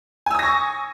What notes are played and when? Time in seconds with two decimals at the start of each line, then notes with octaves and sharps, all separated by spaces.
0.26 G#5
0.31 E6
0.35 D#6
0.39 A#6
0.43 C#6